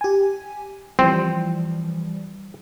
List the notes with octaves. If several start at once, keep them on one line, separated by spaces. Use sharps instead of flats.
G4 G#5
E3 F3 G3 C4